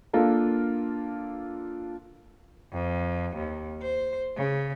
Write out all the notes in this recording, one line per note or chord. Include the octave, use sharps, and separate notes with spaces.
A#3 D4 F4 A4 A#4
F2
D#2
C5
C#3